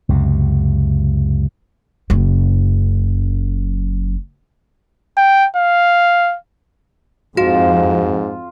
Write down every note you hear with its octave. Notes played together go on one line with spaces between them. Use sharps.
C#2 F#2 C3
F#1 F#2
G5
F5
F2 G#2 F4 F#4